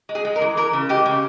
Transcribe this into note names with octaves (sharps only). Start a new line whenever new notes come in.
G#3
G#4
G#3
A#4
E3
E3 A#4
C#3
G#3 G4
C#3